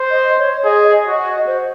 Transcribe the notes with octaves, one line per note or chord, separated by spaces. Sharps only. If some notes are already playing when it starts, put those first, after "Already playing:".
Already playing: C5
D#5
C#5
G#4 D#5
D#5
F#4
D#5
C5